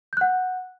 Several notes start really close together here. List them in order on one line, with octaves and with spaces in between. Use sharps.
G6 F#6 F#5